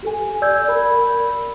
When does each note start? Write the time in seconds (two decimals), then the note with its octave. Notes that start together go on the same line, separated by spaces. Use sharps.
0.03 G4 A4 G#5
0.42 D5 E6 G6 G#6
0.68 A#4 B5